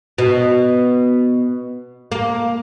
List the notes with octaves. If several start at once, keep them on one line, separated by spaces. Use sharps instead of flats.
B2
A#3